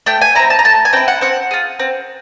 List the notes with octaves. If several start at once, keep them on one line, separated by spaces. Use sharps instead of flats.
A3 G5
G#5
C4 E4 A#5
A5
A#5
A3 A5
G#5
C4 E4 G5
F#5
C4 F#5
F4 G#4
C4